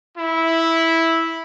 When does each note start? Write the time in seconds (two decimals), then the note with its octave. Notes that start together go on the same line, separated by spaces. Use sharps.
0.16 E4